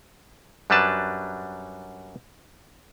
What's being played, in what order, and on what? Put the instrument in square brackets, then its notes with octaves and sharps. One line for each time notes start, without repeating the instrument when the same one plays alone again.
[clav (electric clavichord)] F#2 F#3 G3 D4 B4 A5